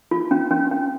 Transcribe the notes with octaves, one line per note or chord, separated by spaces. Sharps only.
F4
C#4
C#4
C#4